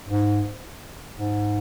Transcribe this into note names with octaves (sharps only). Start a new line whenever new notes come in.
G#2
G#2